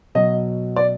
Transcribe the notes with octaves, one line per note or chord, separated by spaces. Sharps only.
B2 F#3 D#5
D5